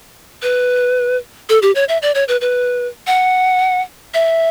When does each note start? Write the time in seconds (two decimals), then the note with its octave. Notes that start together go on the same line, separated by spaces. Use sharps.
0.43 B4
1.49 A4
1.62 G4
1.75 C#5
1.89 E5
2.02 D5
2.15 C#5
2.28 B4
2.41 B4
3.07 F#5
4.14 E5